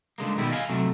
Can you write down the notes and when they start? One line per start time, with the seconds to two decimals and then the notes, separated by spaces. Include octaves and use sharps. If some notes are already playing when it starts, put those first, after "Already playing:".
0.18 C#2 D3 G#3 A#3
0.38 B2 D#3 G3 B3 E4
0.51 D#5 F5 G#5
0.69 C3 F#3 A3